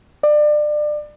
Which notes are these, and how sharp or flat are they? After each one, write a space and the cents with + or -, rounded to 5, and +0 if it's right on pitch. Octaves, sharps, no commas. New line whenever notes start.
D5 +30